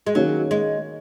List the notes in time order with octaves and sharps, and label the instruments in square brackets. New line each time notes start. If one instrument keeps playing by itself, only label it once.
[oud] G#3
[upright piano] D#3 A#3 C#4 G#4 [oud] F#3
[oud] G#3